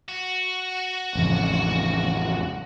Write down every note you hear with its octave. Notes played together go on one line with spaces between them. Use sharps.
F#4
A1 F2 C#3